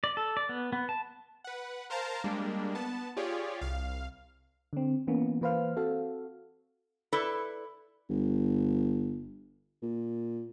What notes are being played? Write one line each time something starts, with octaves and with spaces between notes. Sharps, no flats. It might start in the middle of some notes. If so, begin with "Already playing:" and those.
D5
A4
D5
B3
B3
A5
B4 F#5
A#4 C5 F5 A5 A#5
G3 G#3 A#3 D4
B3 A5
F4 G4 G#4 C#5 D5
C2 F5
D3 C4
E3 A#3 B3 C#4
E3 A#3 B4 C5 F5 F6
C4 F#4 A4 F5
E4 A4 B4 D5
G1
A#2